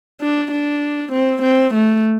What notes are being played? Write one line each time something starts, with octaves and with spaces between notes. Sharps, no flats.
D4
D4
C4
C4
A3